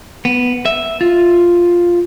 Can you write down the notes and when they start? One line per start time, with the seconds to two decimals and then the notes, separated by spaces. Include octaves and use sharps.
0.25 B3
0.65 E5
1.01 F4